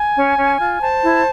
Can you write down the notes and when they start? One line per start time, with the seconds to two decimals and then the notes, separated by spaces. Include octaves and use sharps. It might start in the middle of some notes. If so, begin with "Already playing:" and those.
Already playing: G#5
0.16 C#4
0.37 C#4
0.59 F4
0.81 C5 A5
1.03 E4